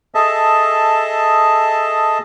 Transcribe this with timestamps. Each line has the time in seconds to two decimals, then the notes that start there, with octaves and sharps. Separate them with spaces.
0.15 G#4 A4 D#5 E5 A5